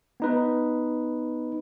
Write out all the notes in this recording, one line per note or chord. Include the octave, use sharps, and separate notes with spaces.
B3 D#4 B4